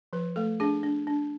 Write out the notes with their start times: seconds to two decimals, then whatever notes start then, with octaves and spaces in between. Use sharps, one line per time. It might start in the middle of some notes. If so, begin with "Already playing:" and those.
0.13 F3 B4
0.36 A3 A4
0.60 D4 G#4
0.83 D4
1.07 D4